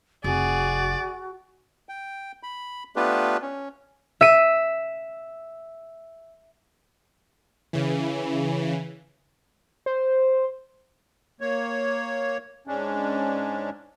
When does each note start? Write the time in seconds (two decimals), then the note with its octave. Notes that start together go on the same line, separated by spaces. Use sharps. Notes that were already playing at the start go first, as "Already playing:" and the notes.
0.24 F1 F#4 G#4 D5
1.89 G5
2.43 B5
2.96 A3 B3 D4 F4 G4 B4
3.42 C#4
4.21 E5 D#7
7.73 C#3 E3
9.86 C5
11.41 A#3 C#5
12.67 G#2 G#3 C#4 D4